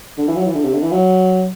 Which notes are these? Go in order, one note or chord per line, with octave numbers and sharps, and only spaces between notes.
D3
E3
F#3
E3
D3
C3
D3
E3
F#3